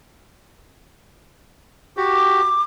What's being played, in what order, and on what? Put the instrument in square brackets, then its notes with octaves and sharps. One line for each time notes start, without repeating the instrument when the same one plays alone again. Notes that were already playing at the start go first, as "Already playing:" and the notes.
[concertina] F#4 G4 [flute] D6